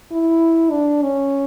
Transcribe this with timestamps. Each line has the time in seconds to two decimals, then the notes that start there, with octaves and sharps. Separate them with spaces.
0.12 E4
0.71 D4
1.02 C#4